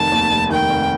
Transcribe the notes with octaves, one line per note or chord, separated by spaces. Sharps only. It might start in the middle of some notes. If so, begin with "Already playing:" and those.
Already playing: F1 D#3 A5
D#2
F1
D#3 G5
F1